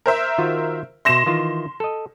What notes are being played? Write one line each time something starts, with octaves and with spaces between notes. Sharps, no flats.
A#4 C5 E5
D#3 F4 F#4
B2 E5 C6 A#6 E7
D#3 E3 F4
A4 D#5